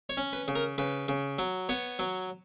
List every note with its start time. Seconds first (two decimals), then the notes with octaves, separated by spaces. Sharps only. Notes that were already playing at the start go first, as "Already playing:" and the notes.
0.09 C#5
0.17 C#4
0.33 B4
0.48 C#3
0.55 A#4
0.78 C#3 B4
1.08 C#3
1.39 F#3
1.69 B3 C#5
1.99 F#3